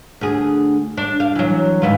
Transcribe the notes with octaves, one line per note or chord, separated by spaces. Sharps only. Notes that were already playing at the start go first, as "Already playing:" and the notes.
D2 G#4
D4
F5
E3 F#3
G#2 E3 F4